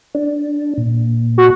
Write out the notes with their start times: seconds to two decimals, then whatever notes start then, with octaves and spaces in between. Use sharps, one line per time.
0.15 D4
0.78 A#2
1.38 F#4